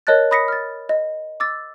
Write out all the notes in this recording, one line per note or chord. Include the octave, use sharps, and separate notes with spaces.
A#4 C#5 D#5 A5 F#6 A6
B5 D#6 A#6 B6 C#7
F6 A6
D#5
D6 E6 A6